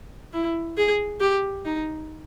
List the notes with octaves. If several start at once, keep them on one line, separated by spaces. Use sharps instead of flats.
E4
G#4
G4
D#4